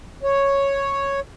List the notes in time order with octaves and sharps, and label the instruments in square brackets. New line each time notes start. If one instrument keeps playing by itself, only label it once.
[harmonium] C#5